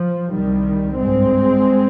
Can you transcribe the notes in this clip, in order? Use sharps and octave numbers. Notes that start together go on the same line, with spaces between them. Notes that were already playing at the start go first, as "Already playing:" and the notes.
Already playing: F3
C2 C3 D#3 G3
G#1 G2 G#3 C4